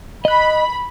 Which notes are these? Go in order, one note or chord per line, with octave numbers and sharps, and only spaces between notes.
D#5 B5 F#6